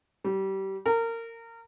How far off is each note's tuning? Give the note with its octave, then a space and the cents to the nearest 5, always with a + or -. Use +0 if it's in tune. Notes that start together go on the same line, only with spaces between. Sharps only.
G3 -25
A#4 -25